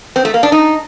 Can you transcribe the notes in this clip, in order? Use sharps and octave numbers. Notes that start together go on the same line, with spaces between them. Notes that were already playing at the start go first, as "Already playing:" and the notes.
C4
A3
A#3
D4
D#4